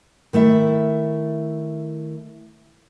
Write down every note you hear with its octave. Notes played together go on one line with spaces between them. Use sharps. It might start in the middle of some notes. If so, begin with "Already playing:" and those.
D#3 A3 E4 E5